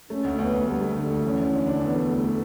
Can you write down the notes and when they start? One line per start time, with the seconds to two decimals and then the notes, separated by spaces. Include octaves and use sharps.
0.10 A3 C#4
0.24 D2
0.39 D2 B3
0.53 D2
0.67 D2 G3
0.82 A3
0.96 D3 A3
1.10 D2
1.25 E2 C#4
1.38 E2
1.53 D3
1.67 D4
1.81 E2 B3
1.96 A3
2.09 A3
2.24 A3